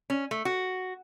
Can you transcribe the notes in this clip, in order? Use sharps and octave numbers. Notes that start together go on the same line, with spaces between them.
C#4
A3
F#4